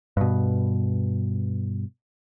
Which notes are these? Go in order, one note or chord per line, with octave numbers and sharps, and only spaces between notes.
G2 B2